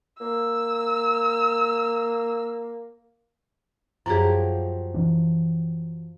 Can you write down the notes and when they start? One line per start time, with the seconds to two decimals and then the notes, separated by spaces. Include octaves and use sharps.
0.21 A#3 E6
4.06 F#2 F3 F#3 G4 G#4
4.94 E3 D4